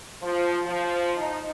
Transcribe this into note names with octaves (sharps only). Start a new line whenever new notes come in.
F3
F3
D#4